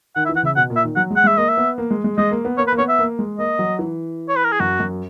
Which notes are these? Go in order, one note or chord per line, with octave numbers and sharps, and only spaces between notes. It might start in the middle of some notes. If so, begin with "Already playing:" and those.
D#3 F#5
E5
E3
F#5
C#3 E5
B2 F#5
A#2
E5
D#3
F#3 F#5
G#3
F#5
G#3 E5
A#3 D#5
E5
B3
A#3
G#3
G#3
G#3 D#5
A#3
B3
A#3 C#5
B4
A#3
B3 C#5
E5
A#3
G#3
A#3 D#5
F#3
E3
C#5
B4
A#4
G#4
F#2 F#4
F#2